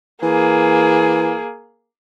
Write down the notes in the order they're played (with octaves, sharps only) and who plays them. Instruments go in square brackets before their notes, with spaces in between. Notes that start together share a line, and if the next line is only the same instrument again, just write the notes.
[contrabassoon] E3 [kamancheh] A#3 G#4